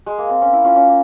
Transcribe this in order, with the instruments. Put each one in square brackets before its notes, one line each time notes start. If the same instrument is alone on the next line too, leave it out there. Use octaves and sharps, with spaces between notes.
[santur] G#3
A#3
C4
C#4
E4
C#4 F4
C#4
A#3